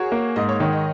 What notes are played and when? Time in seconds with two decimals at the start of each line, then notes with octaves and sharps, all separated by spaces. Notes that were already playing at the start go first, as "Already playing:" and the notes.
Already playing: F#4 G#4 A#4 C#5
0.12 A#3
0.36 G#2 D#5
0.49 C#5
0.60 D#3 C#5
0.73 D#5